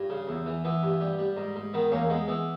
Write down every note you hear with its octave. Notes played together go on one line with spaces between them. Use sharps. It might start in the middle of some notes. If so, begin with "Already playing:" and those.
Already playing: G2
C#3
E2
E3
E3 B3
G2
G3
G3
G#2
G#2
D#3 B3
E2 A#3 C#4
G#3 B3
E3 B3